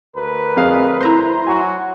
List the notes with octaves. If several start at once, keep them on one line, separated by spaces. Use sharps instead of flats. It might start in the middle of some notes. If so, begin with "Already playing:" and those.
D2 A#4 B4
F2 G#4 F5
E4 C5 A#5 C6
F#3 F#4 G#5